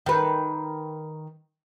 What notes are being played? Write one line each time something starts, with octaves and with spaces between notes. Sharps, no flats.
D#3 B4